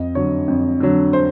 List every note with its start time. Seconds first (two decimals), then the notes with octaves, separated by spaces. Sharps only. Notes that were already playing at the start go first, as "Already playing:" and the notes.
Already playing: F2 D#5
0.15 D3 F#3 C#5
0.48 F2
0.80 D3 F#3
1.13 C5